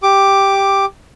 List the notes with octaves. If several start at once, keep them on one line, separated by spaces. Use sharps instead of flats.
G4 D6